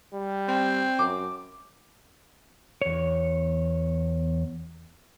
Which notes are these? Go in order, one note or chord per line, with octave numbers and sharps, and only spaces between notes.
G3
C4
F#2 D6
E2 C#5